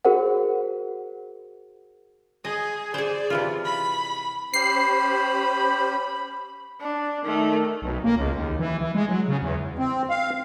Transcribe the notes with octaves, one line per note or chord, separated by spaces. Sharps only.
F#4 G#4 A#4 C5 F#5
G#4 D#5
G#4 C5 D5
C3 E3 F4
B5
C#4 G4 C5 B5 C7
D4
D#3 A3
B1
A#3
C#2
D#2
E3
E3
G#3
F#3
C#3
E2
C4
F5